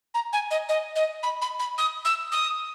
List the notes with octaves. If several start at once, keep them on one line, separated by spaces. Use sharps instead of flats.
A#5
G#5
D#5
D#5
D#5
B5
B5
B5
D#6
E6
D#6